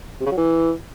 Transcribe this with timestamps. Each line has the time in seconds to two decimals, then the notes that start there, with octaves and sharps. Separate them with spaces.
0.20 C3
0.26 C#3
0.31 F#3
0.37 E3